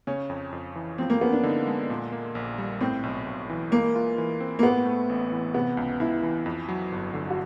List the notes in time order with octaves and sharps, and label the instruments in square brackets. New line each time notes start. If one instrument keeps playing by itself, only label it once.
[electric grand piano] C#3 [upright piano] C#4
[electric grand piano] F2
F2
E3
[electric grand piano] F3 [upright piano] C4
[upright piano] A#3
[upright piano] B3 [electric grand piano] C#4
[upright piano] D4
[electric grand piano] D3 [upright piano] D#4
[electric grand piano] G#3
A#2
A#3
A#1
G3
[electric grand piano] A2 [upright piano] C4
[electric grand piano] B1
B1
E3
[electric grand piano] G#3 [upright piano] A#3
[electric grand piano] F4
E3
C4
[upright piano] A#3
[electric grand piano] A2 [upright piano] B3
[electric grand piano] A3
A1
E3
[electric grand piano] C3 [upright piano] B3
[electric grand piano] C#2
[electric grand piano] C#2 [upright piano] E4
[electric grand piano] E3
F2
F#3
G1
D3
[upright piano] F#4